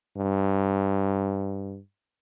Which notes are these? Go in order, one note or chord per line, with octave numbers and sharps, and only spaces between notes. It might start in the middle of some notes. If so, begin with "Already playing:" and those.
G2